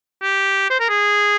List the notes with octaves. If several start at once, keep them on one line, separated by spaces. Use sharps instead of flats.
G4
C5
A#4
G#4